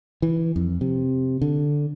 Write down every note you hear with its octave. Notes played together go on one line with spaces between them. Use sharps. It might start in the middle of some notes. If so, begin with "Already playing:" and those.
E3
F2
C3
D3